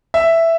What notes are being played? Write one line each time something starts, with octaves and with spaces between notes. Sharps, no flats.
E5